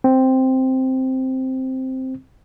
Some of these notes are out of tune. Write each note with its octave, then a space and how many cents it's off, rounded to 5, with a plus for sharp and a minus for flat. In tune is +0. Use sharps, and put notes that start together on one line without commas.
C4 +0